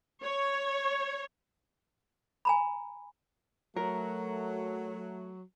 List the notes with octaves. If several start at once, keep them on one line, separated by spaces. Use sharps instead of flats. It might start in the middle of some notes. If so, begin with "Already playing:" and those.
C#5
G#5 A#5 B5
F#3 A3 A#4